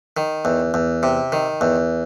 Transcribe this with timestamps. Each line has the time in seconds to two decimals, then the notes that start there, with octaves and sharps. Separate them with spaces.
0.17 D#3
0.45 E2
0.74 E2
1.03 C3
1.32 D#3
1.61 E2